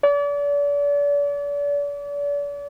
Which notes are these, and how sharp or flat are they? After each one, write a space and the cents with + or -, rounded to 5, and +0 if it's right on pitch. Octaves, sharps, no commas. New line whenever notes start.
D5 -40